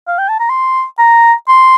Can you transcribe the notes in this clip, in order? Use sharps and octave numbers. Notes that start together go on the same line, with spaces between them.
F5
G5
A5
A#5
C6
A#5
C6